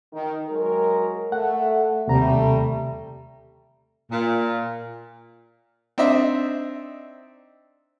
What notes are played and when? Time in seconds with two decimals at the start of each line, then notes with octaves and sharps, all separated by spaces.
0.13 D#3
0.48 F#3 G#3 A#4
1.32 A3 F#5
2.07 D#2 C3 G3 A3 A#5
4.11 A#2
5.98 C4 D4 D#4 D#5 E5